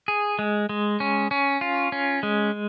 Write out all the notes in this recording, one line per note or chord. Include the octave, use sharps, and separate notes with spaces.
G#4
G#3
G#3
C#4
C#4
F4
C#4
G#3